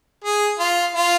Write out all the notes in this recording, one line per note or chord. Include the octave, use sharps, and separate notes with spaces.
G#4
F4
F4